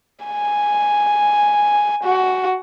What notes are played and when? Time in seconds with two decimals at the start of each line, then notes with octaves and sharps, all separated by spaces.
0.25 G#5
2.03 F#4